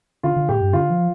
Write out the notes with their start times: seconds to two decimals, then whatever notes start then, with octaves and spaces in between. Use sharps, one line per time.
0.23 D3 F4
0.36 D3
0.48 A2 G4
0.61 G2
0.73 D3 F4
0.90 F3